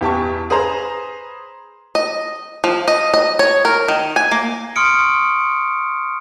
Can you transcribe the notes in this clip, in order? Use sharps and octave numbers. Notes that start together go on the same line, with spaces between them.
E2 G4 A5 C#6
G#4 B4 C5 A#5
D#5
F3
D#5
D#5
C#5
A#4
D#3
G#5
A#3
C6 C#6 D#6 F6 C#7 D7